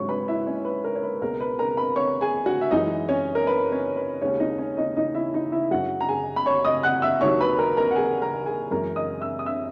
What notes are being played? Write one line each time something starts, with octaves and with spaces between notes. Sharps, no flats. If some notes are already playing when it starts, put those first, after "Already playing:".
Already playing: G#2 F#3 C#5 C#6
B4 B5
E4 E5
C#4 C#5
B4
A#4
C#5
B4
C#2 B2 G#3 A#4
B4
A#4 A#5
B4 B5
C#5 C#6
G#4 G#5
F#4 F#5
E5
F#2 E3 G#3 D#4 D#5
C#4 C#5
A#4
B4
C#4 C#5
B4
D#2 C#3 G#3 C#4 C#5
D#4 D#5
C#4 C#5
D#4 D#5
D#4 D#5
E4 E5
D#4 D#5
E4 E5
F#2 C#3 F#3 F#4 F#5
A#5
G#4 G#5
B5
C#5 C#6
D#5 D#6
F#5 F#6
E5 E6
D#2 D#3 F#3 C#5 C#6
B4 B5
A#4 A#5
A#4 A#5
F#5
G#4 G#5
A#4 A#5
G#4 G#5
F#2 E3 G#3 A#4 A#5
D#5 D#6
E5 E6
D#6
E5 E6